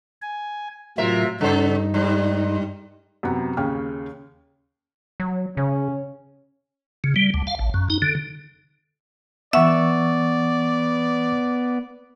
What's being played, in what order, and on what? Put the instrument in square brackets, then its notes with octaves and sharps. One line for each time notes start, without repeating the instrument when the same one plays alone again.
[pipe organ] G#5
[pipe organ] A2 F#3 F4 [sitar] C3 A#4 E5
[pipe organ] G2 D#4 [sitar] C#3 A4 C5
[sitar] G#2 G3
[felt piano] F#2 C3 B3 F#5
D#2 C#3 C#4 G5 F6
[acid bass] F#3
[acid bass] C#3 [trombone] C#4
[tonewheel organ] C#3
G3
D2
F5
A1
F#2
D#4
D3
[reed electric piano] E3 C#6 E6 [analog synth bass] B3 [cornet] D5 [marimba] E5 F#5